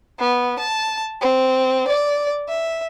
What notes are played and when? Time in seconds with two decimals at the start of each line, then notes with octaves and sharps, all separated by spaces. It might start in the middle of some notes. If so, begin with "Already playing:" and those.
0.17 B3
0.58 A5
1.21 C4
1.86 D5
2.47 E5